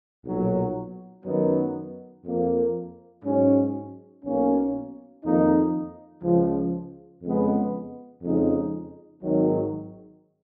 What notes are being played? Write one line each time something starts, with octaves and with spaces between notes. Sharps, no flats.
B1 A#2 F#3
F#2 D#3 F#3 B3 D#4
F2 F3 A#3
G#2 F#3 C#4
B1 B2 A#3 C#4
F2 D#3 A#3 D#4
C#2 C#3 F3
F2 C#3 G#3 B3
F2 C#3 G#3 D#4
G#1 G#2 D#3 F#3